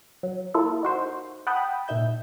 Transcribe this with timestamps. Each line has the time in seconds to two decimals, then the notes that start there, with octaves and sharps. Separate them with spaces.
0.23 F#3
0.54 A#3 E4 F4 A4
0.83 D#4 F#4 C5
1.47 F#5 G5 A5 B5 D#6
1.88 A#2 D#4 E5 G6